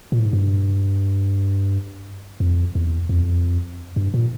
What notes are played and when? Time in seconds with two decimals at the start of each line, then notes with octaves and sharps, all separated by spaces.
0.12 A#2
0.19 A2
0.26 G#2
0.33 G2
2.40 F2
2.75 E2
3.09 F2
3.96 G2
4.14 A#2